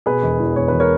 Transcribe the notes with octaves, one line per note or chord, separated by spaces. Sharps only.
B2 G#4 B4
E1
E2
E1 C#5
E1 B4
A#4 C#5